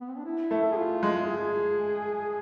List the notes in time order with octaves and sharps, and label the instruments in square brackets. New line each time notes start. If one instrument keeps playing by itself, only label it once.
[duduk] B3
C4
D4
E4
[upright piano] A3
[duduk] G#4
F4
[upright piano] G#3
[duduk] F4
G#4